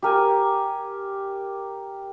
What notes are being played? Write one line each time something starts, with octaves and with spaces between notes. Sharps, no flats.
G4 A#4 G#5